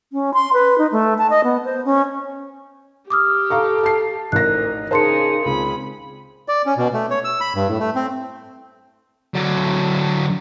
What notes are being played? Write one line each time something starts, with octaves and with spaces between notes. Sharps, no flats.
C#4
C6
B4
D#4
A3
A5
D#5
B3
C5
C#4
G4 D6 D#6 F6
A4 F5 A#5 C#6
A5 C7
A1 D2 D#4 A#4 F#6 A#6
C#3 D#4 G#4 A#4 C5 A5 C6 C#7
C#2 A#2 D#3 C4 G#4 B5
D5
C#4
B2
A3
C#5
E6
B5
G2
A2
A3
C4
D3 F#3